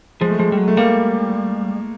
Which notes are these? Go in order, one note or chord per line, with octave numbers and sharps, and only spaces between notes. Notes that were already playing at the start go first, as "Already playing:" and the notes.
F3 G#3
A3
F3 G#3
G3
F#3
A3
G3 A#3